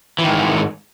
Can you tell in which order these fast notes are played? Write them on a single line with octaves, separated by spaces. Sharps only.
E3 D#3 G#2